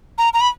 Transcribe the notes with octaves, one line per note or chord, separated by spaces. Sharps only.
A#5
A#5
B5